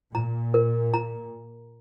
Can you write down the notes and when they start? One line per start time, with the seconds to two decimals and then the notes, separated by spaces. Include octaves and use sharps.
0.14 A#2 A#5
0.54 A#4
0.94 A#5